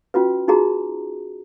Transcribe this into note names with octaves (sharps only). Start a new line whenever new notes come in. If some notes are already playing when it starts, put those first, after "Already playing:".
C#4 F4 F#4 B4
D#4 F4 F#4 G#4 A#5